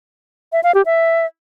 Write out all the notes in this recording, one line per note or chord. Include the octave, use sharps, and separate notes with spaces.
E5
F5
G4
E5